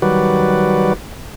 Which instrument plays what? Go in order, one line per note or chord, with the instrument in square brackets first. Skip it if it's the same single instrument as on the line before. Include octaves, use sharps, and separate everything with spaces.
[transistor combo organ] D#3 F#3 G3 F#4 B4 D5